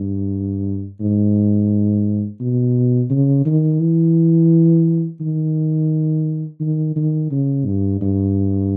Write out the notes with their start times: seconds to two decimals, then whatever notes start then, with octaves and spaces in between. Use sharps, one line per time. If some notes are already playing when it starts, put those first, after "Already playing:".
Already playing: G2
1.01 G#2
2.41 B2
3.10 C#3
3.46 D#3
3.80 E3
5.21 D#3
6.60 D#3
6.96 D#3
7.31 C#3
7.65 G2
8.01 G2